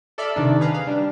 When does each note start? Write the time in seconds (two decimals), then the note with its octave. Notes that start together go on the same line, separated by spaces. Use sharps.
0.18 A4 D5 E5 B5 E6 F6
0.36 C3 D#3 D4 D#4
0.60 G#4 B4 F5 A#5
0.74 F5
0.87 G3 D4